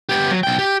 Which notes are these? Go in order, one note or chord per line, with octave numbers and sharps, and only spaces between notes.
B3 G4
F#3
B1 G5
G4